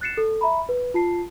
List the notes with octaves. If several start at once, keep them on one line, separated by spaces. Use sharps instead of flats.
F#6 A6 C7 C#7 E7
A4
E5 A#5 B5
B4
F4 A5 C7